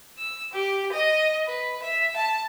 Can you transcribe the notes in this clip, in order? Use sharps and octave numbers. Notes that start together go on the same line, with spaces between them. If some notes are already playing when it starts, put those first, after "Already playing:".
E6
G4
D#5
B4
E5
A5